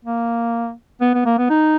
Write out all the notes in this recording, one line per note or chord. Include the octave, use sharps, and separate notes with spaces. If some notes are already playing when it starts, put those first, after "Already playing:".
A#3
B3
B3
A#3
B3
D#4